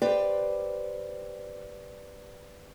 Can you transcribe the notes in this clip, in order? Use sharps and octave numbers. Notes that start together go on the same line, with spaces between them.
G4 B4 C5 D5 G5